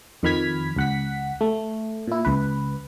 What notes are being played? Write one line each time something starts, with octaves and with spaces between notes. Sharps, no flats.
F2 D#3 B5 F6 G#6 B6
C#2 F#5 B6
A3
A#2 E4
C#2 B4